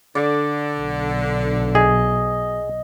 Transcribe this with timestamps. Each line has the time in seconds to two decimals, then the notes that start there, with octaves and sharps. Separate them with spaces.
0.15 D3 D5
0.79 B1
1.75 G#4 D#5